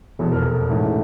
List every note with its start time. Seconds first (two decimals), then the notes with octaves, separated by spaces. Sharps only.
0.19 F1 E2 B2 A4
0.32 A#4
0.46 A4
0.69 A1 G#2 E3 A3